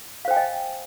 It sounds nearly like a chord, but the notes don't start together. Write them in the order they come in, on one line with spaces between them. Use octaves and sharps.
F5 C5 G5 G#5 D#5